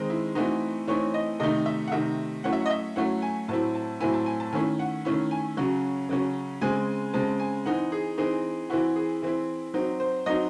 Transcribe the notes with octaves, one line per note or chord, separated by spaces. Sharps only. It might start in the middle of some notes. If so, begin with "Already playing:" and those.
Already playing: D#3 G#3 C4 D#4
E4
E3 A3 C4 D#4 F#4
E3 A3 C4 D#4 C#5
D#5
C3 D#3 A3 D#4 D#5
E5
F#5
C3 D#3 A3 D#4 E5
F#3 A3 C#4 E4 F#5
E5
F#5
D#5
E5
F#3 A3 C#4 E4 F#5
G#5
A2 F#3 C4 E4 A5
A5
A2 F#3 C4 E4 G#5
A5
G#5
A5
D#3 A3 C#4 E4 G#5
F#5
D#3 A3 C#4 E4
G#5
C#3 F#3 C#4
C#3 F#3 C#4
C#3 G#3 C4 G#5
C#3 G#3 C4 A5
G#5
E3 C4 D#4 F#5
G#4
E3 C4 D#4 G#4
E3 C4 E4 F#4
G#4
E3 C4 E4
F#3 C4 D#4
C5
F#3 C4 D#4 D#5